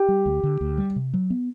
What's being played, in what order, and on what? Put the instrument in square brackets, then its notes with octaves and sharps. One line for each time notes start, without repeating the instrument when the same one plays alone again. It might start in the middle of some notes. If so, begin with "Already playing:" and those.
Already playing: [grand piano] G4
[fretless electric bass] G3
D2
D3
D2
G3
C3
F#3
B3